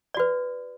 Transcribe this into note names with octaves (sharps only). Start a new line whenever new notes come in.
F#4 B4 D5